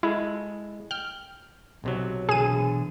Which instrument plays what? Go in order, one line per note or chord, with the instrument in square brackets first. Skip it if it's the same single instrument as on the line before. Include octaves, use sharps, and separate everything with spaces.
[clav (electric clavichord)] G#3 A4 [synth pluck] E4
[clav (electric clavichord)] G5 [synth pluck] F6
[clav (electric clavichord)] B1 C3 F#3
[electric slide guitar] B2 D3 E3 [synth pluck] G#4 D#7